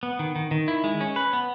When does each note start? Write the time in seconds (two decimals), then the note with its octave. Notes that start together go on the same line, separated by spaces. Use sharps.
0.03 B3
0.19 D#3
0.36 D#3
0.51 D#3
0.68 E4
0.84 G#3
1.01 C#4
1.16 B4
1.33 B3